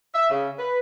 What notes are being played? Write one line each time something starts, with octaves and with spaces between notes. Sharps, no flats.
E5
C#3
B4